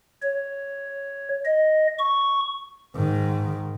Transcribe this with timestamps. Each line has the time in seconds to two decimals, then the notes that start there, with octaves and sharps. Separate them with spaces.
0.22 C#5
1.46 D#5
1.99 C#6
2.96 G#2 D#3